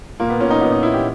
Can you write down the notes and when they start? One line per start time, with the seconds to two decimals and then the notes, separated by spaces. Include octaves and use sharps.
0.20 A#2 A#3
0.30 B3
0.40 A#2 C#4
0.50 D#4
0.61 A#2 B3
0.72 D#4
0.82 A#2 E4
0.94 G4